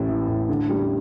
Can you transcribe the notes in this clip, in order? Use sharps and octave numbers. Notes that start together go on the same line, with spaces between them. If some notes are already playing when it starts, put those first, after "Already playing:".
Already playing: A1 A2
E3
A2
D3
G3